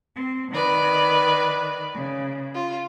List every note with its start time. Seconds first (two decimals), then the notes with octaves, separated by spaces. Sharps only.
0.15 C4
0.51 D#3 B4 D5
1.93 C#3
2.54 F4